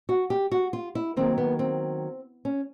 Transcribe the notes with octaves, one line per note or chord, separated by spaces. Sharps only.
F#4
G4
F#4
F4
E4
D#3 F#3 A#3 C4
B3
C4
C#4